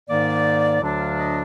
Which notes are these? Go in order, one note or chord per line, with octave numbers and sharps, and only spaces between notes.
G#2 D#3 A#3 D5
D2 D3 F#3 D4
F5
D#5